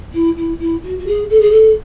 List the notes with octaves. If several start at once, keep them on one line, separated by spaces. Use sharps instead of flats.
E4
E4
E4
F#4
F#4
G#4
A4
G#4
A4